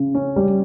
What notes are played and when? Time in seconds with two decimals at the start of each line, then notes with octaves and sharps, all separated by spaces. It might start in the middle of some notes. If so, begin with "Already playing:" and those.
Already playing: C#3
0.15 C#4
0.36 G3